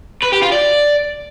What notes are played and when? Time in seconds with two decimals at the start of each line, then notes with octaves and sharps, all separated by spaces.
0.23 B4
0.33 G4
0.43 F4
0.52 D5